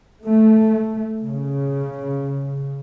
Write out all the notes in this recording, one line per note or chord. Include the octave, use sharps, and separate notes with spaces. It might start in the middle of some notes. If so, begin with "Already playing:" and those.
A3
C#3